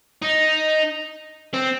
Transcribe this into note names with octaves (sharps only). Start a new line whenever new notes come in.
D#4
C4